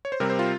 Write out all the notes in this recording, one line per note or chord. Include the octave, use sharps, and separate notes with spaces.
C#5
C5
C3 G3 C4 A#4
C5
F4